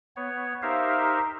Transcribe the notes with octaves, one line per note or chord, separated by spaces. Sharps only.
B3 C#5
D#4 G4 A#4 C5 E5 F5